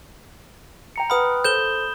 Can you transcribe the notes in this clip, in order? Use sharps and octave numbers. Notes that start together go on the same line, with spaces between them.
G5 A#5 C#7
B4 F#5 B5 D#6 F6
A4 C5 G6 E7 G7